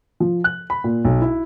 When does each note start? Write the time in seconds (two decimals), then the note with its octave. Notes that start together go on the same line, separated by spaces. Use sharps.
0.20 F3
0.44 F#6
0.70 B5
0.84 A#2
1.05 B1
1.22 E4